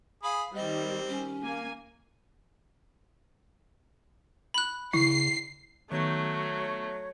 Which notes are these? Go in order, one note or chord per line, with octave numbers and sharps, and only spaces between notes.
G#4 F5 B5
D#3 G3 C4 D#5
C#4
A#3 G#5
B5 F#6
C#3 E4 C#6 C7
D#3 F#3 A3 B3 C#5 G6